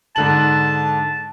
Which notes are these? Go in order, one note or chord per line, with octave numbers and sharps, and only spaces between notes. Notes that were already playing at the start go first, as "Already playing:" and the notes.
G#2 D3 A5 F#7